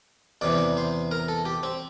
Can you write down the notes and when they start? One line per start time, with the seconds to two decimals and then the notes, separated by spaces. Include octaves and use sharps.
0.41 E2 C3 E3 D5
0.77 C5
1.11 A#4
1.28 A4
1.45 G4
1.63 C4